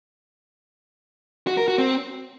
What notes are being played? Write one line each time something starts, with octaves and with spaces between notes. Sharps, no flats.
F#4
A#4
F#4
C4